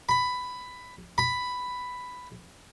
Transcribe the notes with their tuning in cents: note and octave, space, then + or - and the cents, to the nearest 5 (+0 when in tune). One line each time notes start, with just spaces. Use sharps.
B5 +10
B5 +5